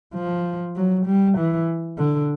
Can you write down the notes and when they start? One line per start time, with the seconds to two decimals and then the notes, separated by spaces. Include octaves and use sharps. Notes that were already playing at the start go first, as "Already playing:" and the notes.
0.14 F3
0.76 F#3
1.06 G3
1.37 E3
1.98 D3